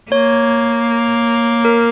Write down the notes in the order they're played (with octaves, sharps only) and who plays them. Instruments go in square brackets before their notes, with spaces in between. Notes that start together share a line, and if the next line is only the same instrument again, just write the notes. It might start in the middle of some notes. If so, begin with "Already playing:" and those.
[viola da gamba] A#3 [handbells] C#5
[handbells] A#4